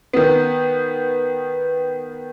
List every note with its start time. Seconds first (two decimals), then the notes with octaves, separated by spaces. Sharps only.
0.13 D#3 B3